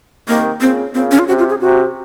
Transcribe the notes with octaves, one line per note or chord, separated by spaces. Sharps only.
C3 D#3 A#3
A#2 C#3 C4
A#2 C#3 C4
C#4
F4
C3 F#4
F4
G#4
C3 F#4